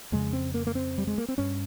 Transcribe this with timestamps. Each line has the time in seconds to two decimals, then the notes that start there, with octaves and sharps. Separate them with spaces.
0.12 F2 C#3 G#3
0.33 C4
0.54 A#3
0.67 A#3
0.75 C4
0.98 G3
1.07 G#3
1.18 A#3
1.28 C4
1.38 G2 C#4